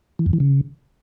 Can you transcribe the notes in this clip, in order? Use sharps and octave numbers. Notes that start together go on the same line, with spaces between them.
E3
F2
E3
C#3